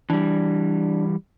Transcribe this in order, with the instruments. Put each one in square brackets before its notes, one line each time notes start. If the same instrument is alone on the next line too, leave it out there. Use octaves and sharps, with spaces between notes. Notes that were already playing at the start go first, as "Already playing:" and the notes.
[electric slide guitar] E3 G3 [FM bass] D4